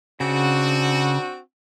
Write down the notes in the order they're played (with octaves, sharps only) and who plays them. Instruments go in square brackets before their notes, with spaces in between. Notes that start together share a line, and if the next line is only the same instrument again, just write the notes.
[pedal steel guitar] C#3 [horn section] C4 D4 F#4